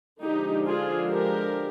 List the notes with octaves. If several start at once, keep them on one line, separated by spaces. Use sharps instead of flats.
D3 F3 G#3 D4 D#4 G4
F4 G#4
G4 A#4